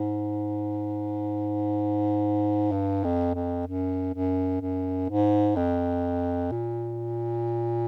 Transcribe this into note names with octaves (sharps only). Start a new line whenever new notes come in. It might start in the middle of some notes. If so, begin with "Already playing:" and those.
Already playing: G#2
G2
F2
F2
F#2
F#2
F#2
G#2
F2
A#2